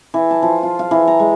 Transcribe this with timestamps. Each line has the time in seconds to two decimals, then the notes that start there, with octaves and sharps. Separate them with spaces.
0.14 E3
0.31 A5
0.43 F3
0.63 F4
0.79 F5
0.91 E3
1.08 A#5
1.19 G#3